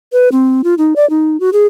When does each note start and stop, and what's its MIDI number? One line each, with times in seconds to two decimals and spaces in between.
0.12 0.29 71
0.32 0.62 60
0.64 0.75 65
0.78 0.94 63
0.96 1.08 74
1.10 1.39 63
1.40 1.50 66
1.53 1.67 68